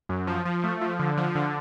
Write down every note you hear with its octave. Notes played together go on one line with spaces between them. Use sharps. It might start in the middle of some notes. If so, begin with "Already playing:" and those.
F#2
F3
F3
A3
F3
D3
F3
D3